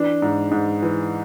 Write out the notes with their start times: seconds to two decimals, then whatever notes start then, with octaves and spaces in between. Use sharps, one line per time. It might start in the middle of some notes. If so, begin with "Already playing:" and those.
Already playing: E3 D4
0.22 G#2
0.51 G#2
0.82 E3